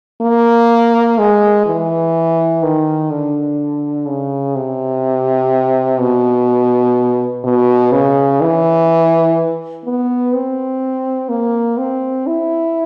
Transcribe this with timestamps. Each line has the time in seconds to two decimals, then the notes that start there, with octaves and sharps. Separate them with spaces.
0.22 A#3
1.19 G#3
1.66 E3
2.63 D#3
3.11 D3
4.07 C#3
4.56 C3
6.00 B2
7.44 B2
7.92 C#3
8.41 E3
9.85 B3
10.34 C4
11.29 A#3
11.78 C4
12.27 E4